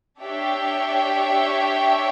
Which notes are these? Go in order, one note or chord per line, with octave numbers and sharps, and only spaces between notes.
D4 G4 C#5 E5 G5